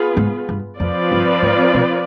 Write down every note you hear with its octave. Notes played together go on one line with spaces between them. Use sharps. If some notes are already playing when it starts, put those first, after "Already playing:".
Already playing: B3 F4 G#4 B4
G#2
G2
F2 F3 C4 F4 B4 D5
G2
G#2
B2